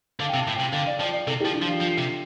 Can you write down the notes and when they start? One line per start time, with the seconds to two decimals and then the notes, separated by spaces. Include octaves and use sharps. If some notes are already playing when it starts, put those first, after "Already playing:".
0.20 D3 F5
0.29 G5
0.34 C3
0.38 A5
0.47 A2
0.56 C3 G5
0.73 D3 F5
0.87 D5
1.00 F3 D5
1.13 D5
1.27 C3 A4
1.41 F3 G4
1.54 D4
1.62 F3
1.67 F4
1.81 F3
1.98 C3